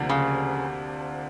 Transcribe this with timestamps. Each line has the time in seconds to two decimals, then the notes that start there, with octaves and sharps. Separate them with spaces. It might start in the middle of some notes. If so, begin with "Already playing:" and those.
Already playing: D2 C3 F3 A#3 D4
0.09 C#3